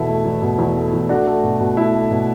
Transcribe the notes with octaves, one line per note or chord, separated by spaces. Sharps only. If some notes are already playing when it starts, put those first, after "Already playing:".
Already playing: E2 B2 E4 A4
A3
E2
B2
E2
A3
E2
A3 D4 F#4
A3
B2
B2
A3 E4
A3
B2